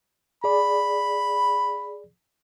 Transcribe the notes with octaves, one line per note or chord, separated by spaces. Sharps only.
G#4 D5 B5